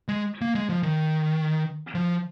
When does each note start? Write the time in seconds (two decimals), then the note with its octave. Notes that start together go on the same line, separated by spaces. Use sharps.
0.08 G#3
0.41 A#3
0.55 G#3
0.69 F3
0.83 D#3
1.95 F3